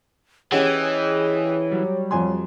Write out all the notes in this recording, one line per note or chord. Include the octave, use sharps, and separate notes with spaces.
E3 C#4 G4 G#4 C#5 D#5 F#5 G5
F#3 G3
F2 G#5 C6